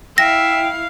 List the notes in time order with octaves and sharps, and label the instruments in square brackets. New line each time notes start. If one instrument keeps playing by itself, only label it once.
[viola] E4 F5 [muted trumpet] E5 [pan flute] G5 [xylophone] A#6